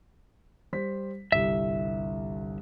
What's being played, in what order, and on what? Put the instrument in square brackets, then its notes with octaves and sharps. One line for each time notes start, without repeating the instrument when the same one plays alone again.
[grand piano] G3 C5 B6
[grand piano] G1 C2 [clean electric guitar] E5